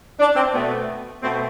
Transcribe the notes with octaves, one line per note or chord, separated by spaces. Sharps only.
D4
C4
B2 A3 B3
B2 A3 C4